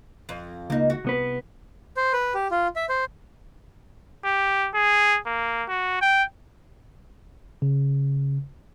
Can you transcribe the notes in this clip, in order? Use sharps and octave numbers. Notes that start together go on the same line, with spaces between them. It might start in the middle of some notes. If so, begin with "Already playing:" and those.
F2
C#2 A#3 D#4
F#4
C2 B3 B4
C5
B4
G4
F4
E5
C5
G4
G#4
A#3
F#4
G5
C#3